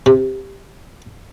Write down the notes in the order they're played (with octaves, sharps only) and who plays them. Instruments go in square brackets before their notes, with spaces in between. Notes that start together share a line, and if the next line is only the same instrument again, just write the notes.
[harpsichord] C3